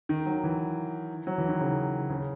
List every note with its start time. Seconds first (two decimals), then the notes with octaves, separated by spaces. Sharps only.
0.09 D#3
0.26 F#3
0.44 E3
1.27 F#3
1.38 E3
1.49 D#3
1.61 C#3
2.10 C#3